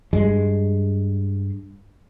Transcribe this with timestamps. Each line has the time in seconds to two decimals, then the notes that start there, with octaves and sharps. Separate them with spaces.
0.13 G2 G#3